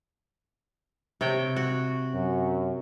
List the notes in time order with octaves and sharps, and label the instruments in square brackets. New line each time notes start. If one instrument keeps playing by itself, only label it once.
[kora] C3 C#5 G5
F#4
[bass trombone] F#2